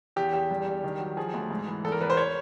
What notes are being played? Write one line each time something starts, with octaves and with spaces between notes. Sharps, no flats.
E2 G4
E2 G4
G2
G2
D#3
F#3
F3 G#4
D2
G#2
E3
E2 A4
A#4
E2 B4
C5
C#5